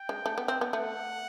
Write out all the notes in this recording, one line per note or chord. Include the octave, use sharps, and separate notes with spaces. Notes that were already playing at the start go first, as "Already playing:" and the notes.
Already playing: G5
G#3
A3
B3
C4
B3
A3 F#5